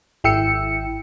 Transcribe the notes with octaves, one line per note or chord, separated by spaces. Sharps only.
G#1 E4 G5 E6 C#7